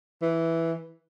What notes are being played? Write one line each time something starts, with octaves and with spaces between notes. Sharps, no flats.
E3